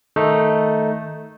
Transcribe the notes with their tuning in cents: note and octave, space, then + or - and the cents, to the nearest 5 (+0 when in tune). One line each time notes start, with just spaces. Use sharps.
D#3 +0 A3 +0 D#4 +0